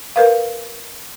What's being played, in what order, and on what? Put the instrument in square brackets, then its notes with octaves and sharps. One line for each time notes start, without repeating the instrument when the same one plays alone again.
[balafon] A#4 B4 F5